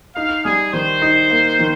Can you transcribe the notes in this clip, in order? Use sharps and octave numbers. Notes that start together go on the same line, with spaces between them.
D#4 F5
G3 G#4
D#3 C5
D#4
A#3
D#3